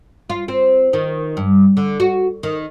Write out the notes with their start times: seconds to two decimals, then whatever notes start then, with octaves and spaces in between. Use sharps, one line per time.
0.30 F4
0.48 C4
0.93 D#3
1.37 G2
1.77 D3
2.00 F#4
2.43 D#3